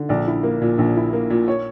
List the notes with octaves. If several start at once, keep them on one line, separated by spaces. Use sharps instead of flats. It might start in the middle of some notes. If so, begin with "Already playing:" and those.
Already playing: D3
A#1 D5
E4
A#3
A#2
A#1
E4
A#3
A#2
C#5